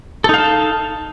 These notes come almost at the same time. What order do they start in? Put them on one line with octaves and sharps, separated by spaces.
A4 D#4 F5 A5